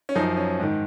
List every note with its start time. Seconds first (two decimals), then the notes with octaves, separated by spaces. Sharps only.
0.09 C#4
0.15 F#2 F3 D#4
0.37 C#4
0.60 G#2 D#3